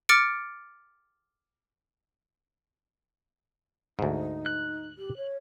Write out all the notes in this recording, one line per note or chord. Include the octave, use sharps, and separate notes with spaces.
D6 F6 A6 C#7 D7
D2 G#2 D#4
F#6
G4
C#5